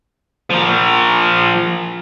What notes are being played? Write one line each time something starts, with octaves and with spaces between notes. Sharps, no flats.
F3 A#4